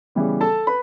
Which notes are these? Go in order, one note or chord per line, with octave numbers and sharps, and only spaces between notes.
C#3 E3 G3 B3
A4 A5
B4 B5